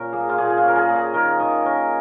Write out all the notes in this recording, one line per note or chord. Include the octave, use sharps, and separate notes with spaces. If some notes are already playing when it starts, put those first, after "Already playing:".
Already playing: A#2 C#4 A#4
A#3 G#4
F4
A#2 G#4
G#4
F4
C#4 A#4
G#4
A#2
G#4
D#3 A#4
D#3 D#5
C#4 A#4